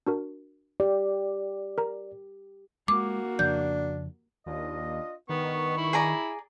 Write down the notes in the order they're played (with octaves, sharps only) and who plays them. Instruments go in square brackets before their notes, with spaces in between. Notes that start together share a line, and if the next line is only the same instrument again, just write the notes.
[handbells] D4 F#4 A#4
[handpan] G4 [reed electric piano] D5
[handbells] A#4 A#5
[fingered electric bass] G#3 [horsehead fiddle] A#3 F#4 [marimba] D6
[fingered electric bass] F2 C#3 F3 [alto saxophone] D4 [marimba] G6
[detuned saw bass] D#2 [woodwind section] D4 F4 D#5
[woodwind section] G2 C#6 [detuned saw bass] D#3 [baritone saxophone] B3
[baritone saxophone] E4
[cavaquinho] G#4 D5 A#5